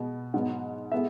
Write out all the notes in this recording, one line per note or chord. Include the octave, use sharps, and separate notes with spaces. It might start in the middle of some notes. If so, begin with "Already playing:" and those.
Already playing: B2 G#3 B3
G#2 F#3 B3 F#5
A2 G#3 B3 E5